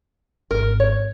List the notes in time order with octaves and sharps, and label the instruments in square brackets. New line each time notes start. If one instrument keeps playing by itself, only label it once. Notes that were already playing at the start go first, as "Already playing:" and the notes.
[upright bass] G#1 [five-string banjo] A#4
[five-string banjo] C#5